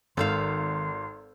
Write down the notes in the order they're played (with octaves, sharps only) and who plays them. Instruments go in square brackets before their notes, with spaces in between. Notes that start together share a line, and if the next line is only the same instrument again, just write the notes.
[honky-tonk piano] G#1 [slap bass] D#3 [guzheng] A4 C5 F5 [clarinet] C6